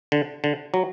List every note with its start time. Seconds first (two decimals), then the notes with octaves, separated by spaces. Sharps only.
0.12 D3
0.44 D3
0.74 F#3